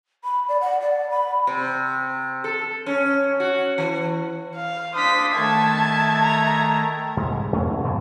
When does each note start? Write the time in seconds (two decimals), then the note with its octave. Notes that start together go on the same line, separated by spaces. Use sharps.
0.24 B5
0.48 D5
0.60 F#5
0.80 D5
1.10 B5
1.47 C3
2.44 A4
2.86 C#4
3.40 F#4
3.78 E3
4.56 F5
4.95 D4 C5 F5 D#6 B6
5.35 D#3 A3 A4 E5 A5 G#6
6.23 A#5
7.17 C2 G#2 G3
7.33 G#3
7.53 F2 A3 C#4
7.66 C2
7.84 G2 B2 F3 F#3